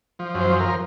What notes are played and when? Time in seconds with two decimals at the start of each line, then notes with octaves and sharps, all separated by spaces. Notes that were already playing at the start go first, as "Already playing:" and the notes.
0.19 F3
0.34 F#2
0.40 C5
0.50 F3
0.60 F3 A#4